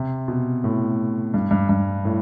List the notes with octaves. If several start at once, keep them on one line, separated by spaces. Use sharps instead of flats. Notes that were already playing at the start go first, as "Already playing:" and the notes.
Already playing: C3
B2
A2
G2
G2
G2
A2